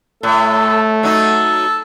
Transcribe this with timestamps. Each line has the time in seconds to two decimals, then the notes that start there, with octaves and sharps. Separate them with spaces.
0.23 A2 A3 A4
1.03 F#3 D#4 A4